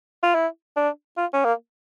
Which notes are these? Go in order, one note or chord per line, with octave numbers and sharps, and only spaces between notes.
F4
E4
D4
F4
C#4
A#3